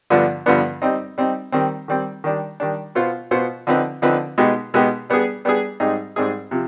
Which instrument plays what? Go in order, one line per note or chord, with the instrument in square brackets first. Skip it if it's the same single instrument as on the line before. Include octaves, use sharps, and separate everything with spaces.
[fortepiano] G2 D3 F3 B3 D4
G2 D3 F3 B3 D4
G3 C4 D#4
G3 C4 D#4
D#3 G3 C4
D#3 G3 C4
D#3 G3 D4
D#3 G3 D4
B2 B3 F4 C5
B2 B3 F4 C5
D3 F3 C4 D#4 B4
D3 F3 C4 D#4 B4
B2 G#3 B3 D#4 G4
B2 G#3 B3 D#4 G4
G3 B3 D4 G#4
G3 B3 D4 G#4
G#2 G3 C4 D#4 G#4
G#2 G3 C4 D#4 G#4
C3 F3